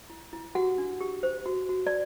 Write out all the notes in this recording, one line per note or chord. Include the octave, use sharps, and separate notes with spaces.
E4
E4
F#4 G4 F#5
D4
G4
C5
F#4
F#4
D5